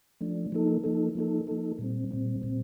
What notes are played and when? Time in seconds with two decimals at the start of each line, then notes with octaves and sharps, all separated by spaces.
0.21 F3 A3 D4
0.52 F3 A#3 D#4 A4
0.84 F3 A#3 D#4 A4
1.15 F3 A#3 D#4 A4
1.47 F3 A#3 D#4 A4
1.79 A#2 G3 C4
2.11 A#2 G3 C4
2.42 A#2 G3 C4